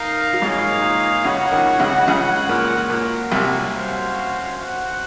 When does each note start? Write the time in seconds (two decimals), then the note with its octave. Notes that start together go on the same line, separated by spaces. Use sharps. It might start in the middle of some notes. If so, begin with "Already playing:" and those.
Already playing: D#4 A#4 F5
0.33 F#3
0.42 G#2 G#3 A#3 D#4 G#4 C#5 F5
0.82 A#2
1.24 C#2 C#3 F#4 C#5 F#5
1.51 D#2 D#3
1.79 C#2 C#3
2.07 C#2 C#3 F#4 C#5 F#5
2.49 A#2
2.90 A#2 A#3 C#4 F#4
3.31 C2 C3
3.73 C#4 F#4 C5 F5
4.55 F#4 C5 F#5